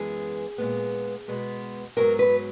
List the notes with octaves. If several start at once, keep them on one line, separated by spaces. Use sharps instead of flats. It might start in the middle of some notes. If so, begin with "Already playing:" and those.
Already playing: F#2 E3 G#3 B3 G#4
A#2 G#3 B3
B2 G#3 B3
G#2 F#3 B3 A#4
B4